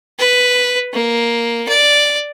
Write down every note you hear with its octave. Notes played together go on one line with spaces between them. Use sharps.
B4
A#3
D5